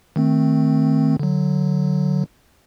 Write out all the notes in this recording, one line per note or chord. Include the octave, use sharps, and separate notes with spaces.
D#3 A3 C4
D3 F#3